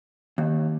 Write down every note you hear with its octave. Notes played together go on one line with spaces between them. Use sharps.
D#2